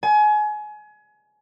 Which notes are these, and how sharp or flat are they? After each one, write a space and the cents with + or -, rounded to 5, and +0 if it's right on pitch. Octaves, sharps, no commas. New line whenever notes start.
G#5 +30